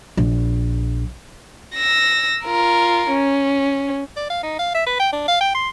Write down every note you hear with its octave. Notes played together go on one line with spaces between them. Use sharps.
A#1
E6 A#6
F4 A#4
C#4
D5
F5
D#4
F5
E5
B4
G5
D4
F5
G5
C6